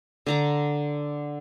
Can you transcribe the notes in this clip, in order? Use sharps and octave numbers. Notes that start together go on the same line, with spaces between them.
D3 A#5 D6